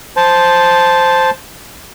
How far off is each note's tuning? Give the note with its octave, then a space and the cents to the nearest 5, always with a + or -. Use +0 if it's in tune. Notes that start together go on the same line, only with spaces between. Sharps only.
C5 +0 A5 -10